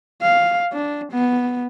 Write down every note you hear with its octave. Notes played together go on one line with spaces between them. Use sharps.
F5
D4
B3